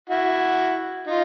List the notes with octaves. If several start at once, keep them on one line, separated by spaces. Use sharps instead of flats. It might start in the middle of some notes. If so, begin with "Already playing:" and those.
E4 F#4
D#4 F4